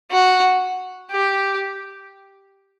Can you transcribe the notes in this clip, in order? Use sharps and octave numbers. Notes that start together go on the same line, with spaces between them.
F#4
G4